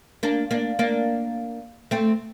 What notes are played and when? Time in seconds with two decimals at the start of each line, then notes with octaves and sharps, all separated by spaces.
0.23 A#3 D4
0.51 A#3 D4
0.79 A#3 D4
1.91 A3 C4